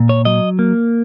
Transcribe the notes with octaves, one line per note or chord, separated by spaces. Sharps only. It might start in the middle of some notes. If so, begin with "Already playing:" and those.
Already playing: A#2
C#5
F#3 D#5
A#3